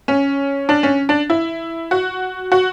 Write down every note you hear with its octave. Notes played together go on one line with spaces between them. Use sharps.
C#4
D4
C#4
D4
E4
F#4
F#4